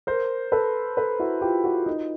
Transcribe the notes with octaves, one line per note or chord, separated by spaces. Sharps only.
A#4 C5
A4 B4
A4 B4
E4 F#4
F4 G4
E4 F#4
D#4 F4